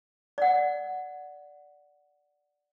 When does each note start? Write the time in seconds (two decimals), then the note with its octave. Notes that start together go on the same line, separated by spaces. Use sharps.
0.38 D5 F#5